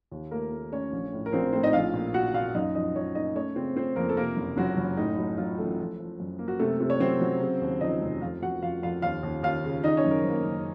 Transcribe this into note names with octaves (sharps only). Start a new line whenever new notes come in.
D#2
A3 A#3 A#4
A3
A3 C#4 C#5
A#1
A2
A#4
A#1 C4 C5
A2 C4 C5
D#4 D#5
A#1 F4 F5
A#2
A#2 F#4 F#5
A#2 F4 F5
F#2 D#4 D#5
F3 D#4 D#5
F3 C#4 C#5
A#3 D#4 D#5
A3 C#4 C#5
C#3 C4 C5
A3 C4 C5
F2 A#3 A#4
A4
C3 A#3 A#4
F#1
F#1 F#3 F#4
F#1
A2 D#4
F#3
F#3 F4
A1 A3 A4
F3
F3
F#2
A#3
F#4
C3 A3 A4
C3
C#5
F#3 C4 C5
F#3
C#3
D#2
F3 D#4 D#5
F1
F2 F4 F5
F2 F#4 F#5
F2 F4 F5
F2 F4 F5
D#2 F4 F5
D#2
D#2 F4 F5
C#3
D#3 D#4 D#5
C#4 C#5
F#2
A#4
F#1 C5
A#3 A#4
F#1